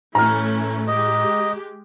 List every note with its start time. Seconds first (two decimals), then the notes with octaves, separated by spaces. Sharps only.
0.15 A2 E3 A3 C#4 A#5 F6
0.88 G#3 G4 D#5